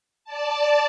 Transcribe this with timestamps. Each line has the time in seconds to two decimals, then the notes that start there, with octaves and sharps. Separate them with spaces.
0.25 D5 A5